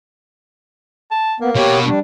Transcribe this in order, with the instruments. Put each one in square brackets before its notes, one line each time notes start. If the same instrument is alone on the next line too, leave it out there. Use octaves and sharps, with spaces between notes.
[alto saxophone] A5
[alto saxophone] A#3 [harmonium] B3
[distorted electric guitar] B2 F#4 [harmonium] G4 C#5
[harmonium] G3 D4